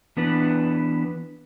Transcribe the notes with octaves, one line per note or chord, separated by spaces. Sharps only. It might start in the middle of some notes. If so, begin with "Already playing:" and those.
E3 B3 D4 B4